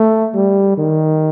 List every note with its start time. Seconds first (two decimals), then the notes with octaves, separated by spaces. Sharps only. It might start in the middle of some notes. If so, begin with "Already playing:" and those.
Already playing: A3
0.34 G3
0.78 D#3